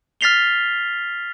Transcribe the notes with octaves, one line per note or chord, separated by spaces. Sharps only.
F6 A6 B6 C7 F7 G7